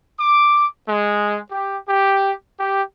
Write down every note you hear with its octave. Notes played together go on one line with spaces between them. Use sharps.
D6
G#3
G4
G4
G4